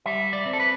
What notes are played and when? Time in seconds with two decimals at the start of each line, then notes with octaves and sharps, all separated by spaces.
0.06 G3 E5
0.33 D5
0.46 C4
0.53 A4
0.60 B4